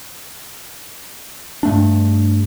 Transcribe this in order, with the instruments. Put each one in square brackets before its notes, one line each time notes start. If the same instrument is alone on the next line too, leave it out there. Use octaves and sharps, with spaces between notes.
[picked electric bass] G2 A3 D4